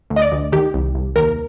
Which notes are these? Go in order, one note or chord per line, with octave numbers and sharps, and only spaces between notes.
D2
D#5
D5
D2
D#3 G4
C2
C2
D#2 A#4